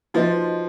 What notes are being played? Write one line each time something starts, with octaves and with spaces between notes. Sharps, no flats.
F3 D#4 F#4 B4 D#5